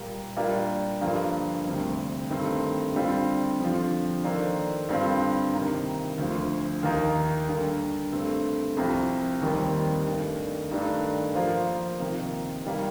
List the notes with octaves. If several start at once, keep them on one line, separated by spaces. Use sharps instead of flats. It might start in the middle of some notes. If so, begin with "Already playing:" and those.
Already playing: A#2 G3 A#3
G3 A#3 D4 F4
G2 D3 F3 A#3
D2 C3 G3
G2 D#3 A3 C4
D3 G3 C4 F4
F2 D3 F3
D#3 A#3 D4 A4 C5
G2 D3 G3 C4 F4
C3 D#3 A#3
D2 D3 F3
D#2 D#3 A#3 D#4
D3 G3 A#3
G2 D3 A3 C4
C2 C3 F3
D#2 D#3 G3 C4 G4
G2 D#3 A3 D4
G2 D#3 A3 D4
F3 A#3 F4 C5
C3 D#3 A#3 F4
D#3 G3 A#3